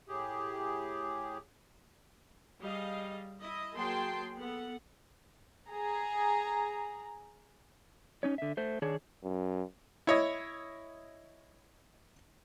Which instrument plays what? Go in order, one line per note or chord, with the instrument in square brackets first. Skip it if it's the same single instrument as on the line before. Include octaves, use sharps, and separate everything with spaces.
[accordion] A2 G4 G#4
[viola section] G3 G#4 D#5 F5
E4 D#5
F#3 A#3 G#4 G5 A5 C6
B3 A4 F#5
[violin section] G#4 A#5
[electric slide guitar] C#4 D#4 C#5
D3 E5
A3 C5
D#3 D4 G#4 C#5
[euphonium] F#2
[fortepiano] E4 C#5 D#5